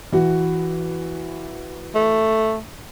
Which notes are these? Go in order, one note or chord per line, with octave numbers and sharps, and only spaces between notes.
E3 F#4
A3